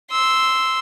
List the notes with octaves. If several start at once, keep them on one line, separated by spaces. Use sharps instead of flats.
C6 E6